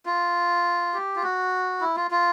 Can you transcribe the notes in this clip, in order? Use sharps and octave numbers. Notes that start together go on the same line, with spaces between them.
F4
G4
F4
F#4
E4
F4
F4